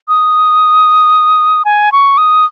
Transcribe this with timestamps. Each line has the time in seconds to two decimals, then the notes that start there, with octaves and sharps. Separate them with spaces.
0.08 D#6
1.65 G#5
1.92 C#6
2.18 D#6